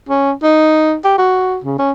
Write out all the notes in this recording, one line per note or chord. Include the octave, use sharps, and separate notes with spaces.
C#4
D#4
G4
F#4
C#3
C#4